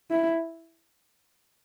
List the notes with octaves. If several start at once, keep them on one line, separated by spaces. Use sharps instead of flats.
E4